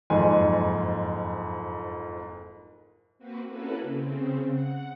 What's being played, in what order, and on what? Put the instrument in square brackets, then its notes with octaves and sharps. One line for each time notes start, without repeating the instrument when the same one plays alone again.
[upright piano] F#1 F2 G#2 G#5 C6
[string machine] A#3 C4 F#4 B4
A#3 C#4 E4 F#4 A4 B4
C#3 C4
F#5